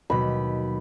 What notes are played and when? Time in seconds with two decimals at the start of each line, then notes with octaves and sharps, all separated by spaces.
0.10 D#2 B2 F#3 B5